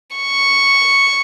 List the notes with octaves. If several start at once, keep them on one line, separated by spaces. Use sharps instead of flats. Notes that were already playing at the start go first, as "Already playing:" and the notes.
C#6